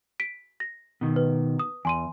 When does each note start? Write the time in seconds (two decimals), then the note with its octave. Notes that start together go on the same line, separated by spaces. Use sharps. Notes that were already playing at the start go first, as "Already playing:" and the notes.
0.20 B6 D7
0.60 A#6
1.01 B2 D#3
1.16 B4
1.59 D#6
1.85 E2 G#5 C6 D#7